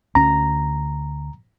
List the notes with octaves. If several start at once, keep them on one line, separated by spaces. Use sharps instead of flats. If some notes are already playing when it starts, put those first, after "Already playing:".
D2 C#4 A#5